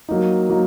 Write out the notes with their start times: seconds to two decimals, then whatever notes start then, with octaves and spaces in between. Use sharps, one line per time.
0.09 F#3 A#3 D#4
0.50 F#3 A#3 D#4